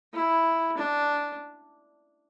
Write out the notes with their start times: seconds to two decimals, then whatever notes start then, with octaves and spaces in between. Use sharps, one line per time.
0.14 E4
0.77 D4